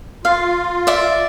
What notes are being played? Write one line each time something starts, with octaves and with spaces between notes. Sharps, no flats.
F4 F5
D5 E5